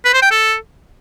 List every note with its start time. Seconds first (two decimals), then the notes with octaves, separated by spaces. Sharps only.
0.05 B4
0.14 C5
0.22 G5
0.31 A4